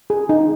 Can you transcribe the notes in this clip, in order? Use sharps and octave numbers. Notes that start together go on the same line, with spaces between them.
G#4
D#4